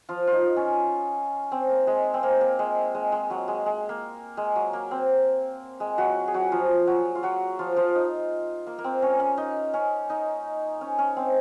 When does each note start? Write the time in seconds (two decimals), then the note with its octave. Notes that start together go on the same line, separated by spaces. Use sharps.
0.09 F3 F4
0.27 D#4 F4
0.56 C#4
1.52 C4
1.69 A#3
1.87 G#3
2.14 C4
2.23 A#3
2.41 A#3
2.59 G#3
2.95 G#3
3.12 G#3
3.30 F#3
3.48 G#3
3.66 G#3
3.89 A#3
4.37 G#3
4.56 F#3
4.73 A#3
4.91 C4
5.80 G#3
5.98 F#3 F#4
6.28 G#4
6.34 F#3 F#4
6.52 F3 F4
6.87 F#3 F#4
7.15 F4
7.23 F#3 F#4
7.59 F3 F4
7.76 F3 F4
7.95 D#4
8.67 A#3
8.78 A#3
8.84 C4
9.02 C#4
9.20 C#4
9.38 D#4
9.74 C#4
10.10 D#4
10.81 C#4
10.99 C#4
11.17 C4